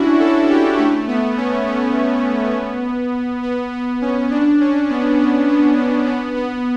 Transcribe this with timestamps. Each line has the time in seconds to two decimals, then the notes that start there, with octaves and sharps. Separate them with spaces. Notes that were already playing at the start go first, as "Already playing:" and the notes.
Already playing: C#4 D4 E4 F#4
0.20 A4
0.49 G4
0.78 A3
1.08 B3
1.37 C#4
1.66 B3
3.43 B3
3.72 B3
4.02 C#4
4.31 D4
4.60 C#4
4.90 B3
5.19 B3
5.48 B3
5.78 B3
6.07 B3
6.36 B3